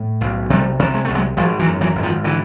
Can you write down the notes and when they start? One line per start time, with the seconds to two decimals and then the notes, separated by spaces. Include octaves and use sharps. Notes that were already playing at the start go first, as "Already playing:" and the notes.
Already playing: A2
0.21 B1
0.50 C3 G3 A3
0.79 C3
0.94 G#3
1.05 C2 A3
1.15 F#3 G#3
1.37 G#1 F3 G3
1.59 E3 F#3
1.67 F#2
1.81 E3 F#3
1.95 G#1
2.03 D#3 F3
2.24 D3 E3